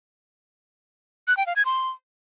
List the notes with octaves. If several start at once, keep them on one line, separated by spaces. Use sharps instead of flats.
F#6
G5
F5
G#6
C6